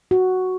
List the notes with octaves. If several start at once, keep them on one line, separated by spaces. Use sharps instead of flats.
F#4